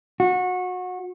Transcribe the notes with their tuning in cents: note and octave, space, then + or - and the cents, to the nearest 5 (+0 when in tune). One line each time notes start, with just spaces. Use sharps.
F#4 -25